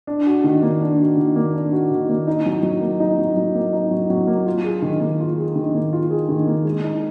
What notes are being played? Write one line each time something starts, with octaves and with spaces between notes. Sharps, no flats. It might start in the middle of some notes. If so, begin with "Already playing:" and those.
D4
F#4
D#3
A#3
D4
F#4
D#3
A#3
D4
F#4
D#3
A#3
D#4
F#3
F#3
A#3
D#4
F#3
F#3
A#3
D#4
F#3
F#3
A#3
F4
G#4
D#3
A#3
F4
G#4
D#3
A#3
F4
G#4
D#3
A#3
G#3
D#4